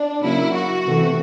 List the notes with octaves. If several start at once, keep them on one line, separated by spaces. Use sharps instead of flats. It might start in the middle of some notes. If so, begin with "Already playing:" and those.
Already playing: D4
C#3 F#3 A#3 E4
F#4
C3 E3 A3